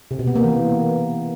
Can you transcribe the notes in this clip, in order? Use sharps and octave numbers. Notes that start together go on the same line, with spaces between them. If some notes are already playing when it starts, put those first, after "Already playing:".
C3
B2
B3
A#3
E3